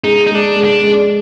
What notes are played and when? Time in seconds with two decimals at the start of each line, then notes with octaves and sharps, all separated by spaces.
0.04 G#3 D#4
0.27 D#4
0.31 G#3 D4
0.56 G#3
0.64 D4
0.83 G#3